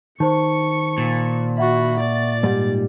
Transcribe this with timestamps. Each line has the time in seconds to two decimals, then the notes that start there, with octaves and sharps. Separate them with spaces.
0.20 D#3 C5 A5 C#6 C#7
0.98 A#2
1.58 F#4 E5 F#5 B5 C#6
2.00 D5 A6
2.43 G#2 G3 G4